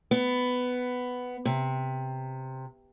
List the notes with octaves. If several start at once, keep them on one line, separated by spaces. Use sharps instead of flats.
B3
C3